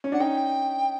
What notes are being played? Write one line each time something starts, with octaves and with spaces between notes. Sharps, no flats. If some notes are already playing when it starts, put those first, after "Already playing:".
C#4
D4 F#5
C#4 D#4 G5